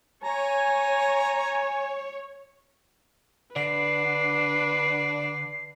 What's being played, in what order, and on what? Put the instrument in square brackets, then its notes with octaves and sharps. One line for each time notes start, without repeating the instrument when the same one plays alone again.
[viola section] C#5 [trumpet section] G#5 [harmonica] A#5
[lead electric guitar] D3 [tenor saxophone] D4 [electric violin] B4 [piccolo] C7